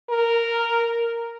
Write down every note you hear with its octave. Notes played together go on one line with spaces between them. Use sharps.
A#4